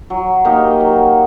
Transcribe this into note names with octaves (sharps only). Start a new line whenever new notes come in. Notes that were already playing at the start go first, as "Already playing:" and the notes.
F#3
A#3 D#4 G4
F#3